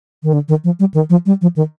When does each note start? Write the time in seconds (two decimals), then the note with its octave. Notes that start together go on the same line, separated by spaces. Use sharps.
0.23 D#3
0.33 D3
0.48 D#3
0.64 F3
0.80 G3
0.94 D#3
1.10 F3
1.26 G3
1.42 F3
1.56 D#3